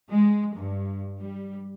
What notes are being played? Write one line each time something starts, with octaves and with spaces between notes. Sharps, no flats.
G#3
G2
G3